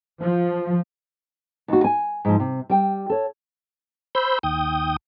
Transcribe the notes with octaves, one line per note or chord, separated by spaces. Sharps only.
F3
D#2 F#4
G#5
G#2 F3
C3
G3 G5
A4 C#5
C5 B5 E6 G6
D#2 G5 D#6